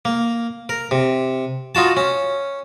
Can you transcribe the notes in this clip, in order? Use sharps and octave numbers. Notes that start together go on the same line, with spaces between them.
A#3
A#4
C3
D#4 F4 F#4 A5
C#4